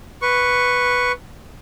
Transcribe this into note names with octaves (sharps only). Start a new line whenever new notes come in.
B4 C#6